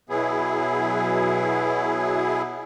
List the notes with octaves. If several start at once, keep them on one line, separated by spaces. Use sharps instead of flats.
B2 F#3 B3 E4 G#4